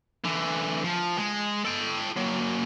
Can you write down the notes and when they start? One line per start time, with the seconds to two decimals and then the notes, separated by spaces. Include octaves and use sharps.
0.24 D3 E3
0.84 F3
1.17 G#3
1.65 A4 G5
2.17 F#3 A#3